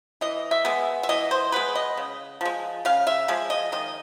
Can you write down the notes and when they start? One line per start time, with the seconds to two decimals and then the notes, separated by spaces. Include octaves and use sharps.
0.21 E3 D#5
0.51 E5
0.65 G#3 B3
1.03 E5
1.09 E3 D#5
1.31 C5
1.52 G#3 B3 B4
1.75 D#5
1.97 C#3
2.41 F3 G#3
2.85 C#3 F5
3.07 E5
3.28 F3 G#3
3.50 D#5
3.72 D#3 D#5